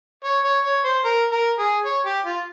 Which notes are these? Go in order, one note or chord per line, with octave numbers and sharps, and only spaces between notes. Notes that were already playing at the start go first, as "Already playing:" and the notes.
C#5
C#5
C#5
C5
A#4
A#4
G#4
C#5
G4
F4